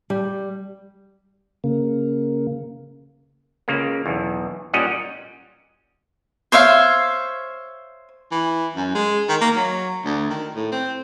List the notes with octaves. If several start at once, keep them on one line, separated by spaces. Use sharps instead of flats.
G3
C#3 A#3
C#2 C#3 A#3
B1 E2
A#2 G3 C#4 D#5 F#5
C5 C#5 E5 F5
E3
F#2
G#3
D#3
A#3
F#3
D2
D#3
A2
C4